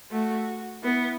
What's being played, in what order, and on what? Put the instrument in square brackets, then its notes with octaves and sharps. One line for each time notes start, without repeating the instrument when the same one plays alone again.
[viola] A3 [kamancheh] F#4
[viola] B3 [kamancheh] E4